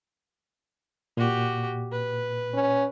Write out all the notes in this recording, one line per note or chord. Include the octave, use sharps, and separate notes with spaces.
A#2 F#4 G4
B4
C#4